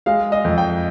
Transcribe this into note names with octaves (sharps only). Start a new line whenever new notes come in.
G#3 F5
D#5
F2
G5